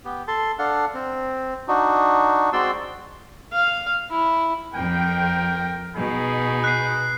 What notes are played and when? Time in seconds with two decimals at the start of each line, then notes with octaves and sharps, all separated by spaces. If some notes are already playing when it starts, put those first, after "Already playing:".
0.05 B3 G4
0.28 A4 A5 C6
0.59 D4 A4 F5 F#5
0.94 C4
1.68 D4 D#4 F#4
2.53 G#3 C4 F#4 D5 C6 E6
3.53 F5
4.10 E4
4.74 F2 A#4 G5
5.95 B2 D#4 G#4 B5
6.64 F#6 C7